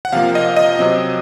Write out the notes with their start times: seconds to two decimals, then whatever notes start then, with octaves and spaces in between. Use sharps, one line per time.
0.05 F#5
0.12 C3 F3 A#3 F5
0.35 D#5
0.57 D#5
0.79 C3 F#3 C4